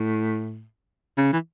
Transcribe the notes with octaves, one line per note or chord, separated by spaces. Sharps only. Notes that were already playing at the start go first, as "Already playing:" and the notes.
Already playing: A2
C#3
E3